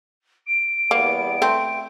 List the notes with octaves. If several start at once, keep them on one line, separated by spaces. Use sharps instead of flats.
D7
E2 G3 A#3 B3
A3 C4